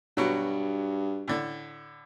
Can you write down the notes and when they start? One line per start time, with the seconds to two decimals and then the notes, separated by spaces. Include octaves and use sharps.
0.17 G2 B2 F#3
1.28 A2 D3